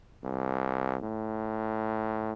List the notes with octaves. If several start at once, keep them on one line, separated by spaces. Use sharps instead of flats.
C2
A2